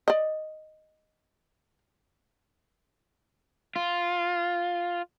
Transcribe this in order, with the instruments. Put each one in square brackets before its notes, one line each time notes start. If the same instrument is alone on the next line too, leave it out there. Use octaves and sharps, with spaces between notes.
[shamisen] D5 D#5
[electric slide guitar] F4